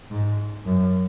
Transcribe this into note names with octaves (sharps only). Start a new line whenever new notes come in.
G#2
F#2